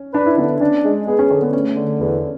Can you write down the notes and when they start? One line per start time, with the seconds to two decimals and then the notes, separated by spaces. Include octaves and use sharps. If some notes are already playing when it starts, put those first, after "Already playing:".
Already playing: C#4
0.14 D4 B4
0.26 E4
0.38 D3 B3 D4
0.60 C#4 D4
0.84 G#3
1.07 B3 G#4
1.19 C#4
1.30 D3 C#4
1.42 B3
1.53 A3 C#4
1.77 D3
2.00 E2